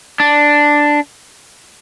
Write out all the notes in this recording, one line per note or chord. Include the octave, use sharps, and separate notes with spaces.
D4